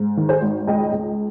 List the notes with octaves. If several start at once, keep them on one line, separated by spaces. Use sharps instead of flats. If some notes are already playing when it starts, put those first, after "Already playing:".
Already playing: G#2
D#3
G#4 C5
G#1
C#2 D#5 G5
C#2